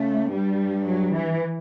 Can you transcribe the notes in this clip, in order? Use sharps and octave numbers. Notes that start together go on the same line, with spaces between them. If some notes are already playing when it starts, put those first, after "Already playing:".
Already playing: C#3 A3
G2 G3
F#3
E3